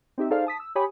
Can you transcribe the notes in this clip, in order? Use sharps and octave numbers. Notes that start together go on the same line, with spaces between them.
C4 D#4 G4 E5
D#4 G#4 A4 C5 D5 F5
A5 D#6 B6
E6
G4 C#5 G#5 B5 D#6